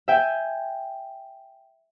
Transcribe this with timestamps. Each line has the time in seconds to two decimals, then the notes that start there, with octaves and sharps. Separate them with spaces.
0.08 E5 G5 G#5